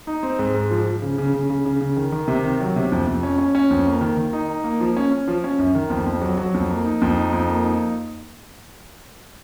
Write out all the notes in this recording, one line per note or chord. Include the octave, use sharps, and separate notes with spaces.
D#4
C4
G#2
G#2
F3
F3
C#3
C#3
C#3
C#3
C#3
C#3
D#3
D#3
C3
D#3
F#3
C3
F2
F2
C#4
C#4
C#4
F2
A#3
D#3
D#3
D#4
D#4
A#3
F3
C#4
C#4
F3
C#4
F#2
D#3
F2
F2
F#3
F#3
F2
A#3
D#4
F2
D#4
F2
A#3
D#4